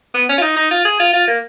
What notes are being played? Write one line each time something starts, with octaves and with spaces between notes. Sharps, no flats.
B3
C#4
F4
D#4
D#4
F4
G#4
F4
F4
A#3